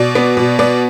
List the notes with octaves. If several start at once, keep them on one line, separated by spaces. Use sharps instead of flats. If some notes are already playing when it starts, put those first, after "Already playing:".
Already playing: B2 D5
B3
B2
B3 D5